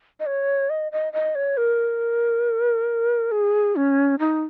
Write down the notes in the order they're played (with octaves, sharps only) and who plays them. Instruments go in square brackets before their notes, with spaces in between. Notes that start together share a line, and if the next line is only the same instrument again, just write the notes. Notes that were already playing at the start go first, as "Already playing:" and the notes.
[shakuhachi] D#5
C#5
D#5
D#5
D#5
C#5
A#4
G#4
C#4
D#4